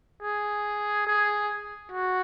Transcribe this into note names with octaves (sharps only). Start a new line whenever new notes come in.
G#4
G#4
F#4